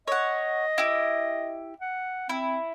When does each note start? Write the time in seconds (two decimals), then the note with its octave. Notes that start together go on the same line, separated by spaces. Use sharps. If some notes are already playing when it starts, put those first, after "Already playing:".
0.08 C#5 D#5 F#5
0.78 E4 G4
1.81 F#5
2.29 C4 E4